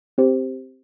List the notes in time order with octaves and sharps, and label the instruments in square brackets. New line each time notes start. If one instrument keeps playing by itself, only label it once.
[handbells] C4 G4 C5